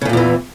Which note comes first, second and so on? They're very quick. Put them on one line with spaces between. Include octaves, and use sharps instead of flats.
C#3 G2 A#2 E2 E3